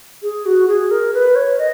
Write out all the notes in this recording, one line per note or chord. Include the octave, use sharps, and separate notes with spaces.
G#4
F#4
G#4
A#4
B4
C#5
D#5